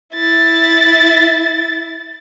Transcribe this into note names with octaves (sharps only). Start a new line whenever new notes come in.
E4 A6